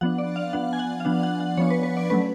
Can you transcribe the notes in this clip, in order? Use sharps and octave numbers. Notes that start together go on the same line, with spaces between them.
F3 B3 D4 F#5
D5
F5
F3 B3 D4 F#5
G#5
F#5
F5
F3 B3 D4 F#5
F#5
F#5
F3 B3 D4 C#5
B4
B4
D5
F#3 A3 C#4 B4